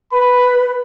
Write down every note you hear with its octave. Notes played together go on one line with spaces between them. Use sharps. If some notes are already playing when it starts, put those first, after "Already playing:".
B4 B5